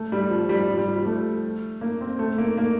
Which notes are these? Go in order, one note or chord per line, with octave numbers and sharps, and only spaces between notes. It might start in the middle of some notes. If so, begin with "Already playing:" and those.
Already playing: A3
G3
F3
G3
F3
G3
F3
G3
A3
A#3
C4
A3
A#3
A#3